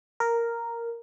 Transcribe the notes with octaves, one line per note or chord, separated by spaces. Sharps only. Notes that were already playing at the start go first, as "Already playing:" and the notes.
A#4